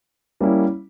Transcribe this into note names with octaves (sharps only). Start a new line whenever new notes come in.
G3 A#3 C#4 E4